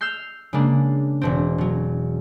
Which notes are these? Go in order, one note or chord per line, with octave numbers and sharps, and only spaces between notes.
E6 F6 G6 C7
C#3 G#3 A#3 D4
E1 B2 C4
B2 F#3